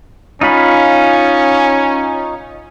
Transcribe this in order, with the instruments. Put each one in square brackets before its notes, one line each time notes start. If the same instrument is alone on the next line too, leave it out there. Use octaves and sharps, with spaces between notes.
[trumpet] C#4 [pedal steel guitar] D#4 F4 B5